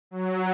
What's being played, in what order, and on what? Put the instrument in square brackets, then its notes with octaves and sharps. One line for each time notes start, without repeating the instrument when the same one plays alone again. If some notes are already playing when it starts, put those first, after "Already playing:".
[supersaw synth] F#3